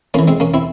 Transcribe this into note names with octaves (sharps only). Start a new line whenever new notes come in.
F2 E3 A#3 C#4
G#3 C4
A#3 C#4
C4 E4